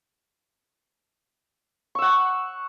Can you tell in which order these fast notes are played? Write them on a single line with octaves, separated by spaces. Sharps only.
C#6 E6 F#5